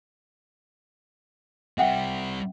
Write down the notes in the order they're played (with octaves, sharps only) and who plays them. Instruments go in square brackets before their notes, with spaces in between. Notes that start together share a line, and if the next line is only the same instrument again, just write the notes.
[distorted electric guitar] G3 C4 [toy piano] E5 F#5 G5